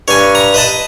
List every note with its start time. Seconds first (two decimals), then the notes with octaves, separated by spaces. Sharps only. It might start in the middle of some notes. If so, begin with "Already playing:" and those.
0.08 G2 C#5 G#5
0.35 A#5
0.54 B4 D#5 A5